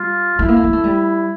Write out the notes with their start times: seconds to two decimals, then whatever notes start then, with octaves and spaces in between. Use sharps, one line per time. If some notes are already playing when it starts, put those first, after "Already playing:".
Already playing: G3 F4
0.39 A3 E4
0.48 A#3
0.56 A3
0.64 A#3
0.73 A3
0.84 G3